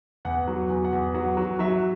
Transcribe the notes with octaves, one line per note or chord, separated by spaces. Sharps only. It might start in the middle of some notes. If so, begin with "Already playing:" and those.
E2 F#5
F#3
E2
F#5
E2
F#3 F#5
F#3
F#3 E5